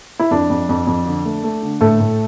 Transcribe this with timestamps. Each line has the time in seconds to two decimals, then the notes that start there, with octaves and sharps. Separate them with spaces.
0.19 E4
0.31 F2 D4
0.50 F2
0.69 F2
0.87 F2
1.06 D3
1.25 A3
1.44 A3
1.63 D3
1.81 A2 A3 A4
2.00 A2